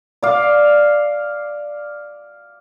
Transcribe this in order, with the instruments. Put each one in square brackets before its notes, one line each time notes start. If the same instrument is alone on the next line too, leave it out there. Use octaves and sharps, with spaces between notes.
[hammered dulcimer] D5 F5